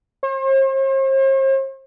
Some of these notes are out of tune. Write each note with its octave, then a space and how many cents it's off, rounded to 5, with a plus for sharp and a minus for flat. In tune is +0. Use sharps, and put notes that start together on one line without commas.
C5 +45